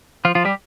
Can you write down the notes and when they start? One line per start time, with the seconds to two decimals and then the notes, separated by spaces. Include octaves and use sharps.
0.25 F3 F4
0.35 F3 F4
0.45 G3 G4